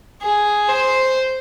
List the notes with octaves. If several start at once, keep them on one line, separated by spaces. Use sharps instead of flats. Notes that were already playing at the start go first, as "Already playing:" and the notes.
G#4
C5